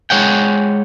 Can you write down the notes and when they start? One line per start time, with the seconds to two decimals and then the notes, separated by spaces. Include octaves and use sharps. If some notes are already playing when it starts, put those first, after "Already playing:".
0.10 G#3 C#5 F#5 G5